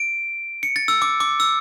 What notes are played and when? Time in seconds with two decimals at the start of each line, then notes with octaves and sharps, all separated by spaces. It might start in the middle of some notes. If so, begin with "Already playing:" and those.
Already playing: D7
0.63 C#7
0.76 A6
0.88 E6
1.02 D6
1.20 D6
1.40 E6